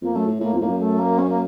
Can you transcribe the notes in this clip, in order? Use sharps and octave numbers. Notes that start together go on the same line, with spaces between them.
F2 A#3
F#2 A3
A2
A2 A#3
F2
A2 A#3
F#2
A3
A#3
C#4
A#3